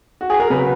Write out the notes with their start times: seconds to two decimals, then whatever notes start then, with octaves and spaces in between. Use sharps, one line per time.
0.21 F#4
0.30 G#4
0.40 A#4
0.50 C#3 F#3 B4